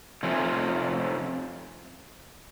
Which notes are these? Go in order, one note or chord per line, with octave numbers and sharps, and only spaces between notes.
F2 C3 F3 A3 C#4